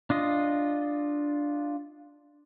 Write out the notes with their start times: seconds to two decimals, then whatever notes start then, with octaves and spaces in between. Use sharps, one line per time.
0.10 D4 F4 D#5